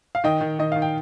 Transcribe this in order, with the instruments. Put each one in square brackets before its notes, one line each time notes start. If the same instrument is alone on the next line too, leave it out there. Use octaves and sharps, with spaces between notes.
[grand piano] F5
D#3 D#5 G5
D#3
D#3 D#5
D#3 F5
G5